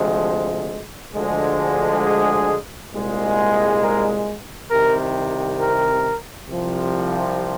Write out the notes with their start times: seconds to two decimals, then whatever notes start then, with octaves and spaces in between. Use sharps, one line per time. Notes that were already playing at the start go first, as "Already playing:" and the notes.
Already playing: D2 C3 F3 G#3
1.15 D2 D3 F3 G#3
2.04 G#4
2.93 C2 A#2 G#3
3.82 A#4
4.71 C2 C3 D#3 A#4
5.60 A#4
6.48 C2 C3 F3